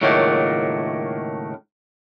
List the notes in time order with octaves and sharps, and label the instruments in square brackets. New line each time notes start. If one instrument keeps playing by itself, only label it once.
[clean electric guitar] C#2 A2 D#3 F#3 A3 A#3